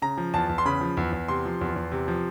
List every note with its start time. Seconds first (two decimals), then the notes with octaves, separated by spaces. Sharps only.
0.02 C#3 A#5
0.17 F3
0.34 E2 A5
0.49 E2
0.58 C6
0.65 C#3 B5
0.81 F3
0.97 E2
1.12 E2
1.28 C3 C6
1.45 F3
1.61 E2
1.76 E2
1.92 C3
2.08 F3